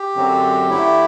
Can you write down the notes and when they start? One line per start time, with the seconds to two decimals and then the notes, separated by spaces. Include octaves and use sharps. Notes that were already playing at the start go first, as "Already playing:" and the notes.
Already playing: G4
0.15 F#2 D3 F#3 C4
0.70 D3 A3 E4